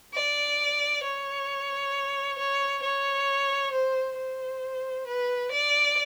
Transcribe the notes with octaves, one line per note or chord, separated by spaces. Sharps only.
D5
C#5
C#5
C#5
C5
C5
B4
D5